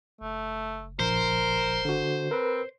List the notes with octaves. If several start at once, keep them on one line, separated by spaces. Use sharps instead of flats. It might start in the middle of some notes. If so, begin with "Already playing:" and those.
F#1 A3
A#1 A#4 C5
D3 F#4
C4 A#4 B4